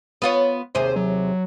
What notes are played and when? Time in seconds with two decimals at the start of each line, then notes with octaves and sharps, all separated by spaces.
0.22 B3 F4 C#5
0.75 D#2 C3 G#4 C5
0.96 F#3